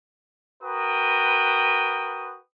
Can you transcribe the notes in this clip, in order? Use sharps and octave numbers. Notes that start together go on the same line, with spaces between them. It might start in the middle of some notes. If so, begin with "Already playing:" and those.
F#4 A#4 B4 G5 D#6